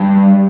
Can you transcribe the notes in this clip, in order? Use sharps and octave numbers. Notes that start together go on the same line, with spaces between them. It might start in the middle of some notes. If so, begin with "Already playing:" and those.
Already playing: G2